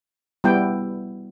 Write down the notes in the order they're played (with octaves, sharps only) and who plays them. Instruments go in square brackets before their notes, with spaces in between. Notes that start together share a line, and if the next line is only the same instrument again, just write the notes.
[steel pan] G3 B3 E4 G5